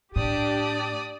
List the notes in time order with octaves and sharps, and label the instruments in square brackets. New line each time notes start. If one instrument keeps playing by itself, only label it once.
[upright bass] A2 [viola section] D4 G4 A5 [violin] D5 D#6